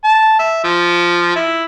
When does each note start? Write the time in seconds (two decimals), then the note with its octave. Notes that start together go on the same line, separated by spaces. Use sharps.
0.04 A5
0.39 E5
0.64 F3
1.36 E4